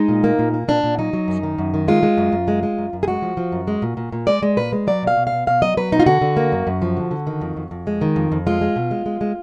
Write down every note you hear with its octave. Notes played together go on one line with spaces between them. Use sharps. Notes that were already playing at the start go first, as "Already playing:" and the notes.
Already playing: G#3 D#4
A#2
A#3
A#2
A#3
A#2 D4
A#2
F#3 D#4
F#3
F#2
D#3
F#2
D#3
G#3 F4
G#3
F#2
F#2
G#3
G#3
F#2
F#2
G#4
G#3 F#4
F3
F3
F#2
G#3
A#2
A#2
A#2
G#3 D5
G#3
A#2 B4
G#3
F#3 D5
B2 F5
B2
F5
B2
B2 F5
F#3 D#5
F#3 B4
B2 D#4
F4
D3 F#4
D3
A#3
F#2
F#2
F3
D3
D3
D#3
F2
F2
F2
G#3
D#3
F2
F2
G#3 F4
G#3
B2
G#3
G#3
G#3